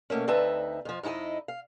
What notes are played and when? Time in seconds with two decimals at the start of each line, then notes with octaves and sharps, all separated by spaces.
0.10 B2 A3 A#3 C#4
0.27 D2 C4 D#4 B4 E5 A5
0.85 F2 F3
1.03 F2 D#4 E4 G4 D#5
1.48 F5